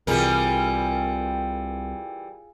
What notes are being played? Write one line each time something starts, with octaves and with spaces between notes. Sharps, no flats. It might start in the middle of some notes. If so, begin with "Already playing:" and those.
C2 C3 E3 G3 F4 G#4 A#4